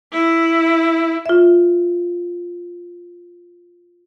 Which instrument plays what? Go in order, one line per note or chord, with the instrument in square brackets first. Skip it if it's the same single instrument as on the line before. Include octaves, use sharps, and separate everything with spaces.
[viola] E4
[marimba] F4 E5